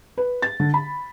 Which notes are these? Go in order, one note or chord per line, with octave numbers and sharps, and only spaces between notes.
B4
A6
D3
B5